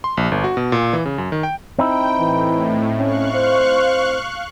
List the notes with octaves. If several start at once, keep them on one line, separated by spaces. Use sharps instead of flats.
C6
A#1
G1
F#4
B2
A#2
E3
C#3
F#2
D#3
G5
C4 D#4 E4 G5
A2 E3
C#4 F5 C#6 F#6
C5